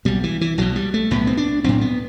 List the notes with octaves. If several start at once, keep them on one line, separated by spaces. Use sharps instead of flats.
B1 B2 G3
E3
E3
B1 B2 F#3
G3
A3
B1 A2 B3
C4
D4
B1 A2 C4
B3